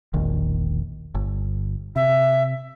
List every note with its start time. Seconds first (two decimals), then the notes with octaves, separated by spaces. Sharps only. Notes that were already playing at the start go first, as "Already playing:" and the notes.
0.14 E1 A#1 D#3
1.15 G1
1.96 C3 E5